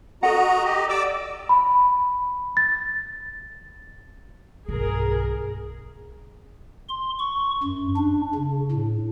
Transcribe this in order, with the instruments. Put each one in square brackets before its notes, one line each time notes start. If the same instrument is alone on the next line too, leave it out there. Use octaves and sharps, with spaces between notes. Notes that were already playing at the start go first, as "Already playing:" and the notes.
[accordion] F#4 D#5 A#5 [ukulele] A4 F#5
[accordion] G4 D#5
D5 D6 E6
[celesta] B5
A6
[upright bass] B1 G2 [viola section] G#4 A#4
[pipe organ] C6
C#6
F#2
D4
C#3
A2